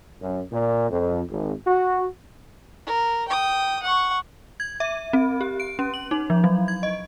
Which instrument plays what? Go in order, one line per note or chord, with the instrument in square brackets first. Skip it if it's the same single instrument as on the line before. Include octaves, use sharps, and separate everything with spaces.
[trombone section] F#2
A#2
F2
G#1
F#4
[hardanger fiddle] A#4
G5 D#6
F#5 C#6
[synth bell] G#6
E5
C4
G4
D7
C#4
F#7
D#4
F3
F#3
G#6
D#5